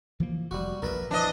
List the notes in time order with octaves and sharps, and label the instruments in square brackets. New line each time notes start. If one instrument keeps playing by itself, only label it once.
[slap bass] E3 F3 A#3
[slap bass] F1 [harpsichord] G3 F#4
[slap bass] A#1 F2 [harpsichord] A#4 B4 E5
[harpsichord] E3 [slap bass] F3 [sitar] D4 D#5